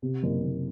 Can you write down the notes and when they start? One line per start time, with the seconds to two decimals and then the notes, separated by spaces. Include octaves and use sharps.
0.02 C3
0.23 F#1
0.44 F#1